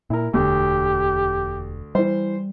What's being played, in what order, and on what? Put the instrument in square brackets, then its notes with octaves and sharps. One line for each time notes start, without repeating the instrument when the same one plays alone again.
[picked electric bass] A#2 [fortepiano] E4 A#4
[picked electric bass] E1 [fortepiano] D2 [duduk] G4
[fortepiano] E3 C5 [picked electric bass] G3